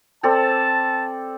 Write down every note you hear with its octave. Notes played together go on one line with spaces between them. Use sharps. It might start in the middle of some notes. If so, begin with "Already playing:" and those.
C4 A4 D5 A5